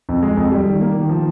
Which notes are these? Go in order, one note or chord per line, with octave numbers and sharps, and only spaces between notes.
F2
G#3
F2
G3
D#3
A#3
D#3
F3